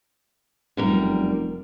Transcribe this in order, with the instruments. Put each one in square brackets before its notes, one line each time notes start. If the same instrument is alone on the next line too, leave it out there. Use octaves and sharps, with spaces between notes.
[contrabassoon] F1 [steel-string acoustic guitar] F#2 G3 A#4